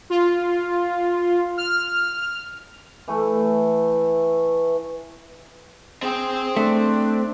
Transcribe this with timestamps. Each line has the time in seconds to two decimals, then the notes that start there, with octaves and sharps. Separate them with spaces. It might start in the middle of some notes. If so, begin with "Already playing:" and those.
0.10 F4
1.57 F6
3.08 E3 A3
6.03 C4 G#4 G5
6.57 A3 D4